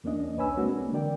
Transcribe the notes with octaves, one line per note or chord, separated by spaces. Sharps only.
E2 A#3 C#4 D4 D#5
C2 B4 C#5 G#5 B5 E6
G#3 A#3 C4 D4 F#4
D3 E3 A#4 D5 G5